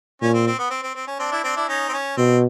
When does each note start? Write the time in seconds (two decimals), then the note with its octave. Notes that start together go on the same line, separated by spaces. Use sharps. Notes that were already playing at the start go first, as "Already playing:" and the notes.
0.22 A#2 C#4
0.34 C4
0.47 C4
0.59 B3
0.70 C4
0.83 C4
0.95 C4
1.07 C#4
1.19 C4 D4
1.31 D4 E4
1.44 C4 D4
1.56 D4 E4
1.68 C#4 D#4
1.89 C4
1.93 C#4
2.17 B2 C4